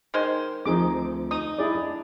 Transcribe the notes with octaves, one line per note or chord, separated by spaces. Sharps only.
D#3 G#3 C5
D2 F3 C4 D#4 G#4 D6
D#4 D#6
E4 G#4 D5
D4